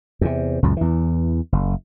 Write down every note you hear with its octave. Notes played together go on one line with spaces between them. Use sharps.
E2 C3
C#2 F#2 A#2
E2 E3
F#1